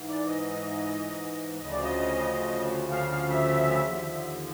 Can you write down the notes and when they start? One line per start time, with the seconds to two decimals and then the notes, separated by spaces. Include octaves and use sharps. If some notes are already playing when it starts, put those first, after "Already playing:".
Already playing: G#2 E3
0.09 D5
0.28 D#5
1.60 D2 C#3 F3 D#5
1.71 D5
1.83 D#5
2.92 F5
3.11 F5
3.30 E5
3.86 D#2 D3 F3